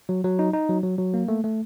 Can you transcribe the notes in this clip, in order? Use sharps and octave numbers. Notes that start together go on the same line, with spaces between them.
F#3
F#3
D#4
D#4
F#3
F#3
F#3
A#3
A3
A3